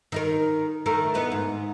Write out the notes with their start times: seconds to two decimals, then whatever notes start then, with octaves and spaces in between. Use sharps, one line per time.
0.12 D#3 D#4 A#4
0.86 D#3 A3 A#4
1.14 B3 D#4 E4
1.32 G#2